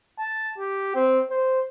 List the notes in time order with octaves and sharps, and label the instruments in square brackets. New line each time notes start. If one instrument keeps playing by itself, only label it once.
[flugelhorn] A5
G4
C4
C5